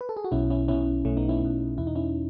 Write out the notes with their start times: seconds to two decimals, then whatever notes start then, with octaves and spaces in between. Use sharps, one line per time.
0.01 B4
0.09 A4
0.17 G#4
0.24 F#4
0.32 B1 B2 C#4 E4
0.50 C#4 E4
0.68 B1 B2 C#4 E4
1.05 B1 B2 A3 C#4
1.17 B3 D#4
1.29 C#4 E4
1.42 B1 B2
1.78 E2 B2 E4
1.87 D#4
1.95 C#4 E4